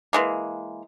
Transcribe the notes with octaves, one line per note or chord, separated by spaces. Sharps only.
E3 G#3 A#3